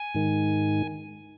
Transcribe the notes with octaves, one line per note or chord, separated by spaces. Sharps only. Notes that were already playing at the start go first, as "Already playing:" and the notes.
Already playing: G#5
G#2 D#3